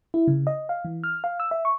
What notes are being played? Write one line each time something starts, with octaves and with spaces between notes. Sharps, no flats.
E4
C#3
D#5
F5
E3
F6
F5
E6
E5
C#6